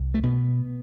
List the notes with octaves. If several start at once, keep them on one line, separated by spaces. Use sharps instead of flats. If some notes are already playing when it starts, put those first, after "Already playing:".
Already playing: C2
A3
B2 B3